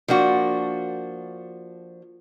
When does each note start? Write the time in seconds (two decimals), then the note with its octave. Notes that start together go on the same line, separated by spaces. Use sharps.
0.08 F3 A#3 D4 F#4